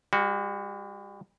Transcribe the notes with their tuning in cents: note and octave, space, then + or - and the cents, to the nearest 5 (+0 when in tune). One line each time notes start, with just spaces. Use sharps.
G3 +40 F#4 +0